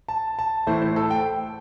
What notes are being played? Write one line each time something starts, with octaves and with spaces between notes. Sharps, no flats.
A5
A5
A2 E3 A3 E4 C5
C5
A4
G5